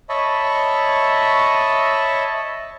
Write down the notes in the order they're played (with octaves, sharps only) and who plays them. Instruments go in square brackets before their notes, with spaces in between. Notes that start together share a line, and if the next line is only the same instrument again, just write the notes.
[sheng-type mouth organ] C#5 D#5 E5 A5 B5 C#6